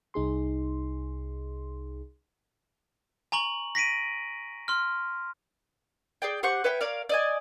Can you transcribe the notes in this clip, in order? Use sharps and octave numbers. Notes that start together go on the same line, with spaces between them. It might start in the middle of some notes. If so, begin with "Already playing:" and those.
C2 D#4 G#4 C6
G#5 A#5 C#6 F#7
A#6 B6 D7 D#7
C6 F6
G#4 D5 G5
G4 C5 F#5 C#6
B4 C#5 E5 G5
A#4 C#5 D5 F5
D5 D#5 G#5